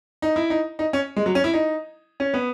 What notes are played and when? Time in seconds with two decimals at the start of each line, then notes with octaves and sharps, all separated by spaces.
0.22 D#4
0.36 E4
0.50 D#4
0.79 D#4
0.93 C#4
1.16 G#3
1.26 F#3
1.35 C#4
1.44 E4
1.54 D#4
2.20 C#4
2.34 B3